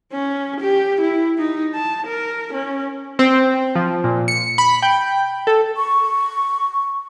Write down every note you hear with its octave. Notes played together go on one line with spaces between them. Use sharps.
C#4
G4
E4
D#4
A5
A#4
C#4
C4
F3
A#2
C#7
B5
G5
A4
C#6